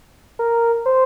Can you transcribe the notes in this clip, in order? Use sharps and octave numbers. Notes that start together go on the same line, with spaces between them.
A#4
C5